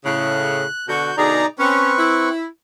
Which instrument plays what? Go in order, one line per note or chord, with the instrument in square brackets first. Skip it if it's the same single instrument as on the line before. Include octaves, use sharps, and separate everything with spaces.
[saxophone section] A2 C#3 [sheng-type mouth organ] F#6
[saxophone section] B2 D3 F#4 [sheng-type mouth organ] G6
[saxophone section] B2 D3 G#4 [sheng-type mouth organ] D#4 D5 A#5
[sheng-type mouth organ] C4 B4 C#6 [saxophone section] C#4
[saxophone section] E4